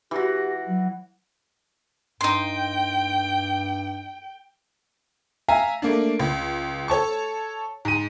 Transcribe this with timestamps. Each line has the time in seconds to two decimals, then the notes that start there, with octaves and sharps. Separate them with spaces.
0.11 E3 F#4 G4
0.67 F#3
2.21 G2 D#4 G5 C6
5.48 E5 F5 G#5 A#5
5.82 A3 A#3 D4
6.19 C#2
6.88 A4 C#5 A5 C#6
7.85 G#2 D#7